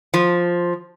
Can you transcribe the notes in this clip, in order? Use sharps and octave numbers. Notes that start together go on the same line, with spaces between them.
F3